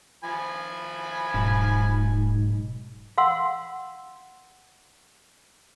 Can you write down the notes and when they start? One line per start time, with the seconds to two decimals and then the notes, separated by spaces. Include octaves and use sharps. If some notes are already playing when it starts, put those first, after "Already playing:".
0.24 F3 G#5 B5
1.34 D#1 B1 G#2
3.18 F5 F#5 C6 E6